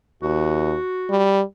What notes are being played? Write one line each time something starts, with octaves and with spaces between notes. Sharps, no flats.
D#2 F#4
G3